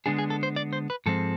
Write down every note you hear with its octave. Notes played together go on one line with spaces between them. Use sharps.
D3 G#3 B3 D4 G#4
G#4
A4
C5
D5
C5
B4
G#2 F3 G#3 C4 A4